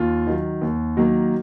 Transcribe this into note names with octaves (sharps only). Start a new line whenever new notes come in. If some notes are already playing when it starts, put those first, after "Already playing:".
Already playing: D#2 F4
D#3 F#3
D#2
D#3 F#3 A#3